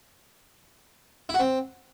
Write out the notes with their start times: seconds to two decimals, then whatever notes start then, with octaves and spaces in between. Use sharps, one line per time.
1.29 E4
1.34 F#4
1.39 C4